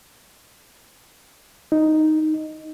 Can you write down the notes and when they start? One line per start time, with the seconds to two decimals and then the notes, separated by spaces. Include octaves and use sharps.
1.72 D#4